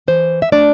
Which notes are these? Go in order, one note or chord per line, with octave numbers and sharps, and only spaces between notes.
E3 C5
E5
A3 D4 D5